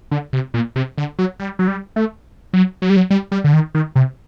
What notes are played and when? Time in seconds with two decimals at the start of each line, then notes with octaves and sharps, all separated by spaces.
0.11 D3
0.33 C3
0.54 A#2
0.76 C3
0.98 D3
1.19 F#3
1.39 G3
1.59 F#3
1.68 G3
1.96 A3
2.53 F#3
2.82 F#3
2.90 G3
2.96 F#3
3.10 G3
3.32 G3
3.44 D3
3.53 D#3
3.75 D#3
3.96 C3